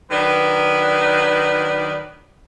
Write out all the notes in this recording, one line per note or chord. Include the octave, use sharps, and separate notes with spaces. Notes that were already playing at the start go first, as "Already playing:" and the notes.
D#3 F#3 D4 B4